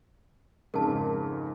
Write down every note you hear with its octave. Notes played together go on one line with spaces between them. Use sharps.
F2 G#2 C#3 A#4 A5